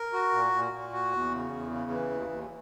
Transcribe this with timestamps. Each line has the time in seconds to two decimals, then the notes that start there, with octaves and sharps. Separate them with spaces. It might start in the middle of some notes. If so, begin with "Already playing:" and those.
Already playing: A#4
0.13 F#4
0.32 A#2
0.53 A#2
0.72 A#2
0.92 F#4
1.12 E2
1.31 C#3
1.51 E2
1.71 C#3
1.91 E3
2.10 D#2
2.30 D#2